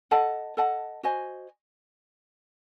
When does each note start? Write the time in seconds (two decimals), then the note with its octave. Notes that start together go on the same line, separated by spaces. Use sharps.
0.11 A4 D#5 F#5 A5
0.57 A4 D#5 F#5 A5
1.03 F#4 C5 D#5 G#5